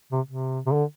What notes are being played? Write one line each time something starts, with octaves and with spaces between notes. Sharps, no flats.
C3
C3
C3
D3